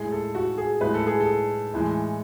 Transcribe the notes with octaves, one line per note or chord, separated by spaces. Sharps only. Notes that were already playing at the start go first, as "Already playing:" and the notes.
Already playing: A2 G#3 G#4
A4
F#4
G#4
A2 G#3 B4
A4
G#4
A4
A2 E3 G#3